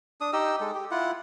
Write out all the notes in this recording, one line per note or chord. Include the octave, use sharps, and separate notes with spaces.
D4 D#6
D#4 G4 D#5 E6
G#3 A4
G4
E4 F4 F#5